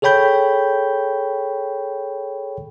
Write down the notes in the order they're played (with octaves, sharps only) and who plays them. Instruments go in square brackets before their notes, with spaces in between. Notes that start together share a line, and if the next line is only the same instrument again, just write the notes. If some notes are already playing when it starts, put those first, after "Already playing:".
[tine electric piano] G#4 A4 C#5 G5 B5 G6